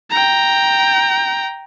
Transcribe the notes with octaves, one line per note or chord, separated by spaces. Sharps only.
G5 A#5